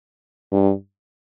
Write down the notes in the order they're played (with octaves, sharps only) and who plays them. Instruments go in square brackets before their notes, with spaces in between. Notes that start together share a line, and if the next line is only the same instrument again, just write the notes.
[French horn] G2